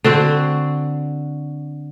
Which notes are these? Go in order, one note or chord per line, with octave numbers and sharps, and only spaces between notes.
D3 C4 F#4